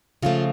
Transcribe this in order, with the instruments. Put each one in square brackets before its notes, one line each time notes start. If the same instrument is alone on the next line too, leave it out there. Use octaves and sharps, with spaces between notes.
[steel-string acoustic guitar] C#3 F3 A3 F4